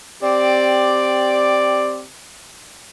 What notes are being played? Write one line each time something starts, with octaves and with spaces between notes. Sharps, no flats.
C4 G4 D5